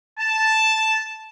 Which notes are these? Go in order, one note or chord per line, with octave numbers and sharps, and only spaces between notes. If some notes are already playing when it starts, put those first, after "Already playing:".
A5